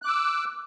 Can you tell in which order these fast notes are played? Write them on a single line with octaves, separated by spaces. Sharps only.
F#6 D6 E6